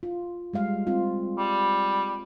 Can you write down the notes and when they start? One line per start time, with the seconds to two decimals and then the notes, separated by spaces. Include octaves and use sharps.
0.03 F4
0.53 G3 G#3 F5
0.87 C4 F4
1.38 G3